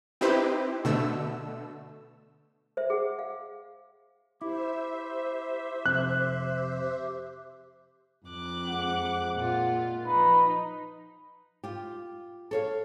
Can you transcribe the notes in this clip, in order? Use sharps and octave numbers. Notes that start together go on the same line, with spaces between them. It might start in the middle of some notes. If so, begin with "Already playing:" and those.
C4 D#4 E4 G4 B4 C5
B2 D3 A3 E6
C5 E5
G#4 F#5
F5
E4 G4 C5 E5
F2 C3 F#6
F2 D6 F#6
G#3 C4 F#5
A#2 F4
F3 D#4 B4
F4 G4
A4 C#5 F5